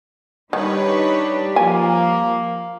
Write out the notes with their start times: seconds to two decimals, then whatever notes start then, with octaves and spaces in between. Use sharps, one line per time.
0.53 D#3 G3 D4 D#4 G4 B4 C#5
1.56 F3 A#3 G#5